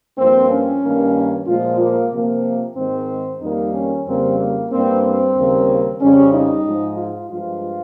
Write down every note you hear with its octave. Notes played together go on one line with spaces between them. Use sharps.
G2 F3 A#3 C4
C#4
G2 D#3 A#3
A#2 F3 G#3 F4
A#3
C3 F3 A#3
G#2 D#3 G#3 C4
F2 D#3 G3 A#3 D#4
C#4
F2 C#3 G3 A#3 C4
A#3
G2 G3 A#3 C4
C4
D#2 C#3 G3 A#3
F2 C#3 G3 C#4
D#4
G#2 F3 G#3
F4
G2 F3 G#3 F4